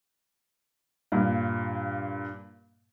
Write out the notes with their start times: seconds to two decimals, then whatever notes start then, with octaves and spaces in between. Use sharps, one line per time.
1.12 G2 A#2